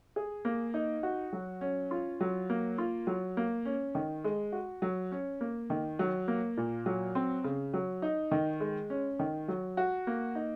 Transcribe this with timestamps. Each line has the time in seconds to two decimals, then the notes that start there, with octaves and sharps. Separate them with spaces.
0.16 G#4
0.45 A#3
0.74 D#4
1.03 F#4
1.33 F#3
1.61 C#4
1.91 F4
2.21 F#3
2.50 A#3
2.78 F4
3.07 F#3
3.37 A#3
3.65 C#4
3.95 D#3
4.24 G#3
4.52 F#4
4.82 F#3
5.12 C#4
5.41 A#3
5.70 D#3
5.99 F#3
6.28 A#3
6.57 A#2
6.86 F#3
7.15 C4
7.44 C#3
7.74 F#3
8.02 D#4
8.31 D#3
8.60 G#3
8.90 C#4
9.19 D#3
9.48 F#3
9.77 F#4
10.07 A#3
10.35 D#4